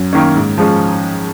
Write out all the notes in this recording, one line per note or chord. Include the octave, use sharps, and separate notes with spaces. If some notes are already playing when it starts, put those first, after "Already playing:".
Already playing: F#2
D#3 A#3 C#4
G#2
F3 G#3 C#4